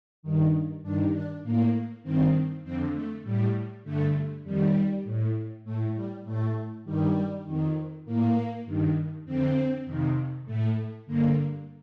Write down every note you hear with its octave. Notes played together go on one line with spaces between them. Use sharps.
G2 D#3
G2 D#3 D4
D4
A2 A#3
G2 D#3 C4
F2 D3 C4
A3
A2 G3
G2 D3 A3
F2 D#3 G3
A2
A2 A3
G3
A2 A3
G2 D#3 G3
F2 D#3
A2 A#3
G2 D#3
F2 D3 C4
F2 C3 D#3
A2 A3
G2 D3 A#3